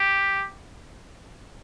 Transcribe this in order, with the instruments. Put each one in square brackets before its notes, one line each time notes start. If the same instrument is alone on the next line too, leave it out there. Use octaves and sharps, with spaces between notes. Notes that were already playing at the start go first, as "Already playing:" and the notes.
Already playing: [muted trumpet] G4